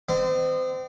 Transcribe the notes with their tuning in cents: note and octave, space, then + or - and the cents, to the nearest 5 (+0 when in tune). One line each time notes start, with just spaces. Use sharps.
C4 -30 D#5 -35